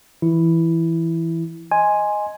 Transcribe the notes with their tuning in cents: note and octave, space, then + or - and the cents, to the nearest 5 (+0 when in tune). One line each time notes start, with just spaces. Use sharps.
E3 +0 E4 +0
D#5 +0 G#5 +0 C6 +0